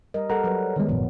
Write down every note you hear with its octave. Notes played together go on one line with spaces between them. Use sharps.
G3 A#4 D#5
G3 A4 A#4 F#5 A#5
F#3 B4
D3 D#3 G3 G#3 B3
G#1 F#2 A#2 E3 F3 B3